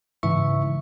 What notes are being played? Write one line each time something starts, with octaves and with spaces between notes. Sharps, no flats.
G#2 C#3 E3 E5 C#6